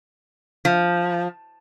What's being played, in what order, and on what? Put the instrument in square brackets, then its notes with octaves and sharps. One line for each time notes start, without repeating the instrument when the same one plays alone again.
[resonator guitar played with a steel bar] F3